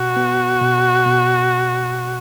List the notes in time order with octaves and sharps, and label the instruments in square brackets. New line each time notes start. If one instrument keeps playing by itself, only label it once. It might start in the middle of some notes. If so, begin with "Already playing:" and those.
Already playing: [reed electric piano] B2 [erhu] F#4
[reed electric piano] B3
B2
B2